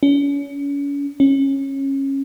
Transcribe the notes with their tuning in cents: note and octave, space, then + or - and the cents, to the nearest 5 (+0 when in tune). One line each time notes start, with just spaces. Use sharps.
C#4 +35
C#4 -20